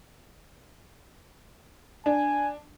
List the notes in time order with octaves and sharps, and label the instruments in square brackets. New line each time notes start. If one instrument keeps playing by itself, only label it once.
[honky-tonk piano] D4 [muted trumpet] G#5